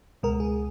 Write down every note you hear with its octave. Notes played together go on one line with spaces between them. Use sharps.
C#2 B2 G#3 A#4
G#4